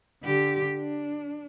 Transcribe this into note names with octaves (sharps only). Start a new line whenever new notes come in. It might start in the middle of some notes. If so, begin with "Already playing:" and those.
D3 G4
D4